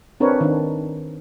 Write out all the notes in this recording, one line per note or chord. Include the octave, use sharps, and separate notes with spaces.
C4 D4 A#4 B4 C#5
D#3 D4